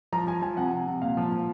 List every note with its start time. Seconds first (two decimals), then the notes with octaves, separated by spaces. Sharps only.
0.12 F3 A#5
0.27 F3 G#5
0.42 F3 G#5
0.57 C3 F#5
0.72 C3
0.87 C3
1.02 A#2 F5
1.17 F3
1.32 F3